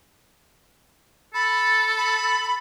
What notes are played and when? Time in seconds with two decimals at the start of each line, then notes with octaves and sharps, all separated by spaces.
1.34 A4 B5
1.97 B5